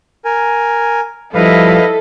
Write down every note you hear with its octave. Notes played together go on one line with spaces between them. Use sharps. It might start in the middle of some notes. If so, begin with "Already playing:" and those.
A#4 G#5
F3 G3 E4 A4 B4 D#5 F5